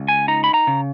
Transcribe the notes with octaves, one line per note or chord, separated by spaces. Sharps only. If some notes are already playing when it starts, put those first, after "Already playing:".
Already playing: C#2
G#5
D#4 A#5
B5
A#5
C#3